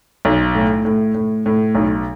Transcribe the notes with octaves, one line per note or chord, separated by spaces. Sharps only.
B1
A2
A2
A2
A2
B1